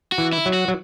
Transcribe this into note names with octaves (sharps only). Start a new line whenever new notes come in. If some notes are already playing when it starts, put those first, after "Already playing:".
F#4
E3
E4
F#3
F#4
F#3